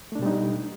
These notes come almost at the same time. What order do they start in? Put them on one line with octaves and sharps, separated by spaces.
A3 D4 B2 G3 D#4